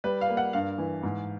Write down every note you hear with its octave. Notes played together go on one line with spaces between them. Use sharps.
G3 B4
F5
A#3
F#5
G2 F5
E3
G#2